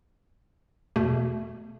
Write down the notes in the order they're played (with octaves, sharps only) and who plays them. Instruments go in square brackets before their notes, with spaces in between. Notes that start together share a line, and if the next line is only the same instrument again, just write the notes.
[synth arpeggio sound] E2 B2 A3